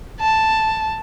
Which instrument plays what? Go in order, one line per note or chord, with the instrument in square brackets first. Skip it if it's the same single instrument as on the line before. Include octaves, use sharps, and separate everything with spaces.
[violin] A5